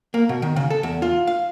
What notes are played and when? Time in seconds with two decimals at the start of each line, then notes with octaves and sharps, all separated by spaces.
0.14 A#3
0.29 B2
0.42 D#3
0.56 C#3
0.70 A4
0.83 E2
1.02 F4
1.27 F5